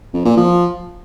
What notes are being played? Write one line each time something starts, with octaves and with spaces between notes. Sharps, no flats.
F2
A#2
F3